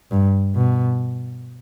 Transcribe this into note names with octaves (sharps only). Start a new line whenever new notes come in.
G2
B2